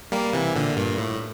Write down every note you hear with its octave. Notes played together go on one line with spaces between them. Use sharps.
G3 A#3
C3 E3
A#2 D3
G2 A#2
A2